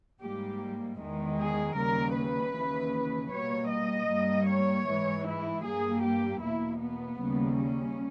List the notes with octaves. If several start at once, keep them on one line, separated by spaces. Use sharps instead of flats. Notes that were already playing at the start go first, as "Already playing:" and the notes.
G#2 G3 A#3 G4
E2 D#3 G#3
G#4
D#2 C#3 G3 A#3 A#4
B4
D#2 C#3 E3
B2 G3 A#3 C#5
D#5
G2 G3 A#3
C#5
G#2 E3 G#3
E4
G2 G3 A#3 G#4
G4
E2 B2 A#3 E4
B3
D#2 C#3 G3 A#3
C#4